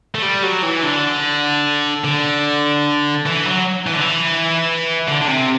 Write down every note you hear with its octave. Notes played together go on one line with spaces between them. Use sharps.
A3
G3
F#3
E3
D3
D3
E3
F#3
E3
D3
E3
D3
D3
C3